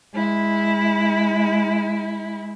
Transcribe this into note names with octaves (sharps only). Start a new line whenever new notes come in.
G#3 E4